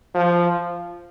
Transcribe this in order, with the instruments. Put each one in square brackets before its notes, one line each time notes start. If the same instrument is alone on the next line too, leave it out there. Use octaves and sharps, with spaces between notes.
[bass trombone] F3